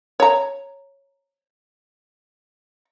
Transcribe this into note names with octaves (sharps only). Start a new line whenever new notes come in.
C#5 A#5